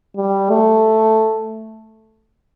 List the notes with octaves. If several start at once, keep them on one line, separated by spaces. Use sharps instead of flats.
G3
A3